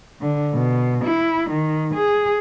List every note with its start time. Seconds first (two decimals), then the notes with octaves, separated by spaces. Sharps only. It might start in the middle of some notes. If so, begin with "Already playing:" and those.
0.21 D3
0.53 B2
1.04 E4
1.50 D#3
1.94 G#4